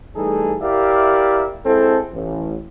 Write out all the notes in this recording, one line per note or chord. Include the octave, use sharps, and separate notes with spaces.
E3 G3 A3 D#4 G#4 A4
E4 G4 A#4 D5 E5 F5
G#3 C4 E4 A4
A1